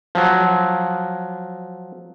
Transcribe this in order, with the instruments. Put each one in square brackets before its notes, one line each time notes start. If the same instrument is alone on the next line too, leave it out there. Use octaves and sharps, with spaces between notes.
[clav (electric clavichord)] F3 F#3